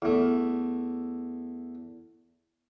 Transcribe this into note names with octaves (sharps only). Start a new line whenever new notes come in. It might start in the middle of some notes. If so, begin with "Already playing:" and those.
E2 A3